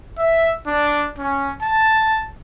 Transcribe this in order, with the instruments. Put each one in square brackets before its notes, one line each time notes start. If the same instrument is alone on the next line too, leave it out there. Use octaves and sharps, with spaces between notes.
[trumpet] E5
D4
C#4
A5